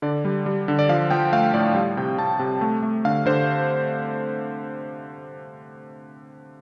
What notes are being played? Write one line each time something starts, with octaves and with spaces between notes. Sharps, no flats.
D3 D5
G3
G3
D3
D5
F3 F5
F3 G5
A3 F5
A2 D5
G3 F5
C3 G5
C3 A5
C3
A3
A3
D3 F5
D3 C5